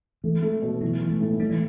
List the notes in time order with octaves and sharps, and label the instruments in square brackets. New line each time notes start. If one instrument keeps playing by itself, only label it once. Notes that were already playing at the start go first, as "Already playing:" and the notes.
[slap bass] E3 [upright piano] A3
[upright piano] A3
B2
[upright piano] E3 [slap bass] F#3
[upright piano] E3
[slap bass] A3
[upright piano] A2
[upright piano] A2 [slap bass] G3
[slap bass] E3